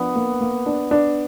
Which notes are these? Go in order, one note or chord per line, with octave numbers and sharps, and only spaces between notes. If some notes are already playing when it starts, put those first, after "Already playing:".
Already playing: F3 B3 D4
A#3
A#3
D4
D4